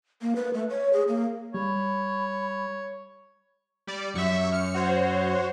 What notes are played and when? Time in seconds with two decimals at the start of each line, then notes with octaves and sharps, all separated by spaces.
0.22 A#3
0.36 B4
0.54 A3
0.70 C#5
0.93 G#4
1.08 A#3
1.54 G3 C#5 B5
3.87 G3 D5
4.15 F#2 E5 C#6
4.52 F6 C#7
4.74 F#4 C5 C#5